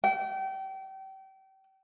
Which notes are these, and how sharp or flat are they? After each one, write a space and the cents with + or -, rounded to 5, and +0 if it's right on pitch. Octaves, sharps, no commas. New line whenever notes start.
G5 -30